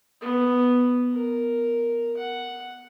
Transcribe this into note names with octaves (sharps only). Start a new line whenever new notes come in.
B3
A#4
F#5